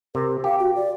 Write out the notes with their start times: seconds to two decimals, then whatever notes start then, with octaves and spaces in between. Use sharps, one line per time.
0.15 C3 A#4
0.44 G4 F5
0.59 F#4
0.76 D5